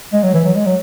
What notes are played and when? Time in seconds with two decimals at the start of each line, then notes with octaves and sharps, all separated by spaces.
0.13 G#3
0.24 F#3
0.34 E3
0.45 F#3
0.56 G#3
0.66 F#3